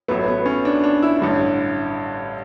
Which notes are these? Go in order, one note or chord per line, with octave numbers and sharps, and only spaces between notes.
A1 A2 F#3 A3 B3
B3
C#4
D4
D4
E4
A1 G2 D3